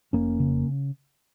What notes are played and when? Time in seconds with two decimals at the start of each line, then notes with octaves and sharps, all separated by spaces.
0.13 F1 A#3 C#4
0.40 C#3